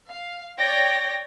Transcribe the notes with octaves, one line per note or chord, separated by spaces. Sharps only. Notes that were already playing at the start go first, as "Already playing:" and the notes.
F5
C#5 D5 G5 A#6